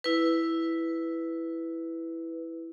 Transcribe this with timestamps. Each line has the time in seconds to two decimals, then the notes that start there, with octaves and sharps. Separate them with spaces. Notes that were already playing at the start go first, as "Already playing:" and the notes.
0.04 E4 B4